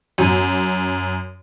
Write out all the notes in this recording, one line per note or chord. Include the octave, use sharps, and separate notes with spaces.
F#2